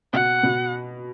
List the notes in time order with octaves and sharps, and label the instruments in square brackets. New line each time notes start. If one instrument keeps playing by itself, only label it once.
[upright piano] B2 [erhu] F#5
[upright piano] B2